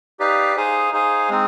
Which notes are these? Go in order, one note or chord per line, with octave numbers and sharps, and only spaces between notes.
D#4 G4 B4 D5 F5
D#4 G#4 C5 F5 G#5
D#4 G#4 C5 F5 G#5
G#3 C4 D#4